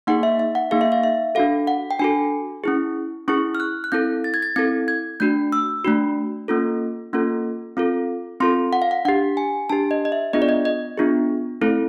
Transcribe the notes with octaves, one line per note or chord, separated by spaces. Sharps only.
A#3 D#4 G#4 F#5
E5
E5
F#5
A#3 D#4 G#4 F5
E5
F5
E5
D4 F#4 A4 F5
F#5
G5
D4 F#4 A4 G#5
C#4 E4 G#4
C#4 E4 G#4 C#6
F6
F#6
F#6
C4 E4 A4 G6
A6
G#6
A6
C4 E4 A4 G#6
G#6
A3 D4 F#4 G6
E6
A3 D4 F#4
A#3 C#4 F4 A4
A#3 C#4 F4 A4
C4 F4 A4
C4 F4 A4 C6
F#5
F5
F#5
D4 G4 F#5
G#5
D4 G4 A5
D#5
D#5
E5
B3 D4 F4 G#4 D#5
D5
D#5
D#5
B3 D4 F4 G#4
A3 C4 E4 A4